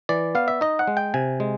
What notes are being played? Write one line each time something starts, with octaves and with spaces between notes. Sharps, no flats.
E3 D5
B3 F5
E5
D#4 D#5
F#5
G#3
G5
C3 G#5
G#3